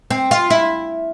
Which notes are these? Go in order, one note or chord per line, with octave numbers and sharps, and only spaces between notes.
C4
F4
E4